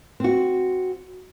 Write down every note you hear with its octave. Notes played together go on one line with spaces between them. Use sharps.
C4 F#4